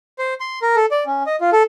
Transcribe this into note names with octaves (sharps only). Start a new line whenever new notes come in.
C5
C6
A#4
A4
D5
C#4
D#5
F4
A4